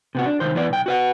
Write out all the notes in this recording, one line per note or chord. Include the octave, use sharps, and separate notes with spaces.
C3 B3 F#4
D4
C2 D#3 C5
E3 B3 D5
B1 G5
F#4 B4 F#5